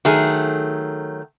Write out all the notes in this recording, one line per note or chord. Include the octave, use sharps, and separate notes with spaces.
D#3 F#3 A3 G#4